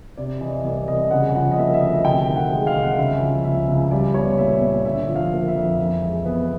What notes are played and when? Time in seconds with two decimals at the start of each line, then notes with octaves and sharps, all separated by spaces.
0.17 C3 D5
0.41 E3 D#5
0.64 C2 D5
0.88 C2 D#5
1.11 C#3 F#5
1.35 F3 F#5
1.51 D#5
1.58 A#3 E5
1.74 E5
1.81 D2 D#5
2.04 C3 G5
2.28 D#3
2.36 F#5
2.51 G#3
2.67 F5
2.74 C2
2.83 F#5
2.91 F5
2.98 C#3 E5
3.22 F3
3.44 C#2 E5
3.68 C#2
3.91 G3 D5
4.14 B3 C#5
4.38 A#2 E5
4.61 A#2 D5
4.85 D3 E5
5.09 F3
5.16 F5
5.32 A#3
5.48 E5
5.55 F2
5.79 E3
6.02 G#3
6.25 B3